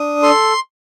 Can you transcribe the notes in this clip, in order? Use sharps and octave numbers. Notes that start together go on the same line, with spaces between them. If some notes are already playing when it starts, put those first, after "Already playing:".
Already playing: D4 D#6
A4 C6